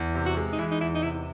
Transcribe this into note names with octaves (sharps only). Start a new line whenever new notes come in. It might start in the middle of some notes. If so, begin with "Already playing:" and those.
Already playing: E2
C3
F#4
G#3
D#4
E3 E4
D#4
E2 E4
D#4
C3 E4